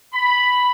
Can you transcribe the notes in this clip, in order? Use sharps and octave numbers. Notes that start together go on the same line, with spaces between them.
B5